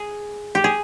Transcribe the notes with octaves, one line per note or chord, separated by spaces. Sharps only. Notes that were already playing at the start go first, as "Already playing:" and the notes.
Already playing: G#4
G4
G#4